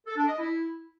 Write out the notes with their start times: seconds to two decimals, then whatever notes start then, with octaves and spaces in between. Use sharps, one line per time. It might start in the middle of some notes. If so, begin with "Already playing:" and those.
0.07 A4
0.17 D4
0.27 D#5
0.37 E4